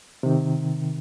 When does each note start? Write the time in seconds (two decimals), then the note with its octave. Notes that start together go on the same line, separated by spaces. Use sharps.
0.23 C3 D#3